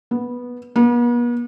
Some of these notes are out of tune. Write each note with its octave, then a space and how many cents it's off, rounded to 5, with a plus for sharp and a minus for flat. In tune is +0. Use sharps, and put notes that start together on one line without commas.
B3 -10
B3 -45